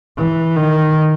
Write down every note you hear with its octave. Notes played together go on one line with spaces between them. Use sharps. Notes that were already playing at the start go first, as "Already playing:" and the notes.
E3
D#3